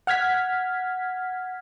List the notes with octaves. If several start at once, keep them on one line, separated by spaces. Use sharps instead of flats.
F#5 F6 G#6 B6